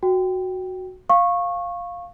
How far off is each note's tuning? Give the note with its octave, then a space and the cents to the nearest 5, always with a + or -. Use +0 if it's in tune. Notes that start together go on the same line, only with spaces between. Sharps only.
F#4 +0 G5 +0
F5 +5 C#6 -15